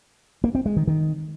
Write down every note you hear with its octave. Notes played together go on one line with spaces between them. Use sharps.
A#3
C4
G#3
D#3
D#3